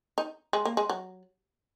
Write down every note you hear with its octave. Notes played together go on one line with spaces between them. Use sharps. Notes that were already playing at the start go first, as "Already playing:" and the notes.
D#4
G#3
A#3
G#3
F#3